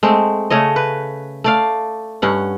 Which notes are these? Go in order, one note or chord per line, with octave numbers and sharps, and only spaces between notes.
G#3 A3 C4
C#3 A3 C#5 D#5
B4
A3 D5 F5
G2 C#4 F#5